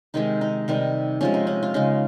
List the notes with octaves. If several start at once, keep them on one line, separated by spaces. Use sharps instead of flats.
C3 D#3 G#3 D#4
D#4
C3 D#3 G3
C3 F3 G#3 C#4
D#4
C#4
F4
C#3 G#3 D#4